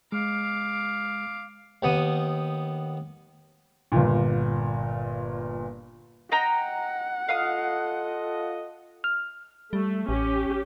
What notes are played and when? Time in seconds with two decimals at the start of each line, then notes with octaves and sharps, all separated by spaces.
0.12 G#3 F5 D6
1.83 D#2 B3 D#6
3.92 G1 A#2
6.32 D#5 F#5 G5 A#5
7.29 F4 A4 D#5 F5 D#6
9.04 F6
9.73 G3 A3
10.09 A1 C#4 G4